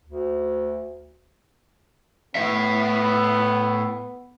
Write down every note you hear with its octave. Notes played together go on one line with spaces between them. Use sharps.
D2
A2 B3 E5